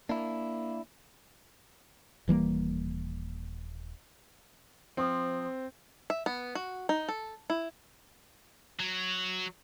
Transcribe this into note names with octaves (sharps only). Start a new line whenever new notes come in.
A#3 D4 E4
D#1 E3 G3 A#3
F3 C4
E5
B3
F#4
D#4
A4
E4
F#3